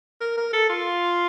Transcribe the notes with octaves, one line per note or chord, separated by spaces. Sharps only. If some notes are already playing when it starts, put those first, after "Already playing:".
A#4
A#4
A4
F4